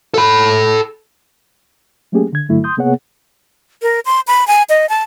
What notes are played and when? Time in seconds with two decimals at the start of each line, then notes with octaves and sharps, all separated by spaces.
0.14 A4 B5
2.12 F#3 A3 A#3 C#4 G4 G#4
2.33 D3 G#6
2.49 G2 D3 F#3 A3 E4
2.64 C6 D#6 G6
2.77 C3 A#3 B3 G#4 C#5 F#5
3.82 A#4
4.05 C6
4.27 B5
4.47 G#5
4.69 D#5
4.89 A5